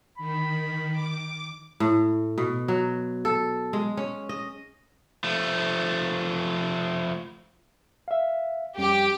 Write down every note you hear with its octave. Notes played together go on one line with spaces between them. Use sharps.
D#3 B5
D6
A2
B2
F#3
A4
G#3
C#4
D#5
F3 A3
E5 F5
F2 G3 C#4 G4